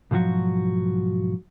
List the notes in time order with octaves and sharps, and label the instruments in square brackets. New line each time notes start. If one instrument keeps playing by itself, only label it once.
[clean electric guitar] B1 G#2 F3 F#3 F#4